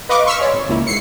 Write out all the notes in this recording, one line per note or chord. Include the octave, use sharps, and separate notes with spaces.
B4 D#5 F5 C#6 D6
C6 C#6 E6 F6 B6 C#7
G#4 C#5 D5
G#1
C#2 A#3 E4
G#2 C7 C#7